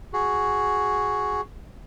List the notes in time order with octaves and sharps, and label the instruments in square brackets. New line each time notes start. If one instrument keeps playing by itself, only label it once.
[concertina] F#4 G#4